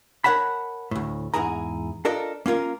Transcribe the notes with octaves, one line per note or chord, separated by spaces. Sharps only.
A#4 C5 C#5 F#5 A5 B5
D2 A2
E2 G#2 E4 G#4 A#5
D4 F4 A4 A#4 D5 D#5
A#3 C#4 F4 A#4